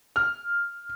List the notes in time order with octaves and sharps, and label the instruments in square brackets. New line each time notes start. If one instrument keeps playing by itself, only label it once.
[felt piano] F6